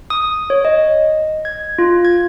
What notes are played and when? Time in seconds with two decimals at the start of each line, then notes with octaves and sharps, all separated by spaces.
0.10 D#6
0.50 C#5
0.65 D#5
1.45 G#6
1.79 F4
2.05 G#6